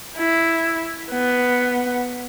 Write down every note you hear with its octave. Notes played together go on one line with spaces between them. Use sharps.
E4
B3